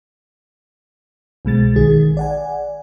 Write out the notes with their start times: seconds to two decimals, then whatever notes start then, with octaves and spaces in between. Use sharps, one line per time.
1.45 C2 B2 G#3 A6
1.75 A#1 D#3 G#4
2.17 D5 F#5 G#5